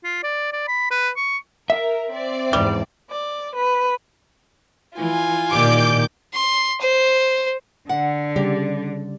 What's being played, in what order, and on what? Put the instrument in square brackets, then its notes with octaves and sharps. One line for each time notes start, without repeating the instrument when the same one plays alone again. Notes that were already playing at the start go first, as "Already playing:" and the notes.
[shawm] F4
D5
D5
B5
B4
C#6
[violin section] A#4 [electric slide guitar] E5
[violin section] C4 D5
[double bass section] E2 G#2 [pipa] G3
[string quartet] D5
B4
[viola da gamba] E3 [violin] F4 G#5
[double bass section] A#2 D#3 [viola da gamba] G4 D5 [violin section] D6 G6
[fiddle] C6
C5
[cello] D3 [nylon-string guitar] F#5
[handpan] C#3 G3 D5 [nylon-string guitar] G4